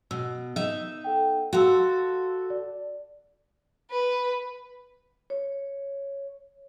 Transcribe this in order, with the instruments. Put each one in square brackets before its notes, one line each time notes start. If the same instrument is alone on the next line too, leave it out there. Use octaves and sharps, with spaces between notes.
[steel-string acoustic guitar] B2 [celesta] E6
[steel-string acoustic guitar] D#4 E5
[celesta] A4 F#5 G5
[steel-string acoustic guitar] F#4 A4 [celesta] F5 C6 E6
[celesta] D5
[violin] B4
[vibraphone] C#5